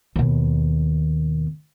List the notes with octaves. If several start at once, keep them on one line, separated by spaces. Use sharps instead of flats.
D#2 B2